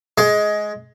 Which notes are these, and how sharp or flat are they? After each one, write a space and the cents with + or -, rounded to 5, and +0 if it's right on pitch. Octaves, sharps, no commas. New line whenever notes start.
G#3 +15